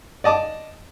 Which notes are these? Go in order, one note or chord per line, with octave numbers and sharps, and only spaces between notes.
D5 D#5 A5 D6